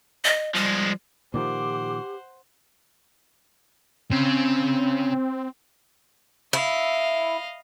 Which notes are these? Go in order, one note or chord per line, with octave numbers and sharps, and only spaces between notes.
D#5
F3 G3 G#3
A#2 D#3 F3 G4 C5 F#5 D6
C#3 C4
E4 D#5 F5